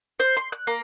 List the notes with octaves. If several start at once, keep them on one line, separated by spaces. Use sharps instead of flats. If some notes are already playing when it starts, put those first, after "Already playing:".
C5
C6
F#6
A#3